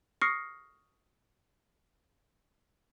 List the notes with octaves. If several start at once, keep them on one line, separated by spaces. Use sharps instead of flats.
C#6 D#6 F6 A#6 C7 C#7